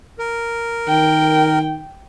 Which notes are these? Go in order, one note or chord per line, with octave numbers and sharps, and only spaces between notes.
A#4
D#3 G5